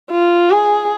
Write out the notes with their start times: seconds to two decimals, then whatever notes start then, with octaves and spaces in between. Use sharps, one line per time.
0.11 F4
0.51 G#4